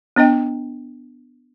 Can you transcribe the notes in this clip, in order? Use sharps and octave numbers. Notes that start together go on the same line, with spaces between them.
B3 D4 D#5 G5